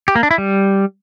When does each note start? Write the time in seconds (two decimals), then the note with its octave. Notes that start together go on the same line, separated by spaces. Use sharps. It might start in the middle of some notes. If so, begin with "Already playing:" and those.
0.08 G4
0.15 A#3
0.23 D4
0.31 E4
0.38 G3